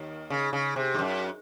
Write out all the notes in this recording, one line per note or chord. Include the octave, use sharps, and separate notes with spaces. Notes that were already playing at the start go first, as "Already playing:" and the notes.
Already playing: D#2 D#3
C#3
C#3
C3
G#2
F#2